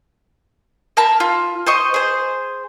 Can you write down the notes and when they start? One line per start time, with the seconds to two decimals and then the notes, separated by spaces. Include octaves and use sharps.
0.97 A#4 A5 B5
1.20 F4
1.67 C5 D#5 C#6
1.94 G#4 C5